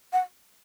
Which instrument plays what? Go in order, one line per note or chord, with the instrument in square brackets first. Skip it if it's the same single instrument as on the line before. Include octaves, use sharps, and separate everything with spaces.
[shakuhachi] F#5